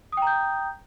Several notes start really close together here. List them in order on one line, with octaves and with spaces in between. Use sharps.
D#6 G5 A#5 G6